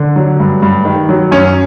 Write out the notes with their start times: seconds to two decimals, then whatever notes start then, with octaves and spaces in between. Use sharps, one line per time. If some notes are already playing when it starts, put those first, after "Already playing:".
Already playing: D3
0.16 F#3
0.40 G2
0.62 G2
0.85 D#3
1.09 F#3
1.31 F#2 C#4